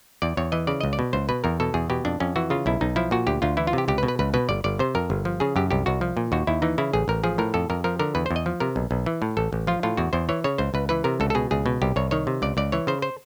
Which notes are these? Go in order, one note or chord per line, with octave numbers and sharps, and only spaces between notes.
E2 D5
E2 C#5
E3 D#5
C#3 D5
C#2 D#5
D5
B2
C#2 C5
B2 B4
E2 A#4
B2 A4
E2 G#4
B2 G4
F2 D4
F2 C#4
E3 F#4
C#3 F4
B1 E4
B1 D#4
F3 E4
A#2 F#4
D2 G4
D2 F4
E3 E4
F4
C3 G4
C#2 G4
B4
B2
B4
C#2 B4
B2 B4
G1 D5
G1 D5
C3 C5
F2 A#4
G1
F3
C#3 G#4
F#2 G4
C2 G4
C2 F#4
F3
A#2
D#2 F#4
D#2 E4
E3 D#4
C#3 E4
A1 G#4
A1 A#4
F3 G#4
A2 A#4
F2 A4
F2 A#4
F3 A#4
D3 A#4
E2 B4
C5
E2
D#5
F3
C3 A#4
B1
B1
E3
A2
A1 A4
A1
F3 F4
A2 F4
E2 F#4
E2 C5
E3 C#5
C#3 C#5
C#2 C5
C#2 B4
E3 B4
C3 A#4
C#2 A4
A4
B2 G#4
C#2 G#4
B2
C2 G4
C2 C#5
D#3 C#5
C3
C#2 D5
C#2 D5
E3 C#5
C#3 C5
C5